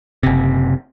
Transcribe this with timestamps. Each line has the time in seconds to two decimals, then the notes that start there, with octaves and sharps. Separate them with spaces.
0.23 F#1 C3